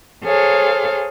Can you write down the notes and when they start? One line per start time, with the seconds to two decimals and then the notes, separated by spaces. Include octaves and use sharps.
0.24 G#4 A4 C5 C#5 F5